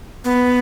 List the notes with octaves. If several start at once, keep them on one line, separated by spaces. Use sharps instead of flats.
B3